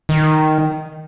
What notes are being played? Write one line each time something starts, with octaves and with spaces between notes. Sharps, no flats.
D#3